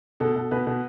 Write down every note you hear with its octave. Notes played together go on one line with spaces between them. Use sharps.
B2 A4
B2
B2 B4
B2